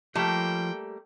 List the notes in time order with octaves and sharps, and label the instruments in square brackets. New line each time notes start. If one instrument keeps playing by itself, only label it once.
[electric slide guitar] F3 [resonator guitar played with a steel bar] G3 A3 A#3 [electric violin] G5